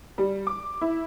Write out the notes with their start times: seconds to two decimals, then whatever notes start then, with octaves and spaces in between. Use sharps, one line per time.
0.18 G3
0.47 D6
0.81 E4